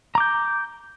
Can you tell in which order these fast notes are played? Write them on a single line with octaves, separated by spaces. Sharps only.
A#5 D6 G6